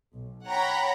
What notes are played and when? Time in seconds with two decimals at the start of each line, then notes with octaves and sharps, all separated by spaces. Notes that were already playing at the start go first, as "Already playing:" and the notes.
0.14 B1
0.47 C#5 F#5 G5 A#5 B5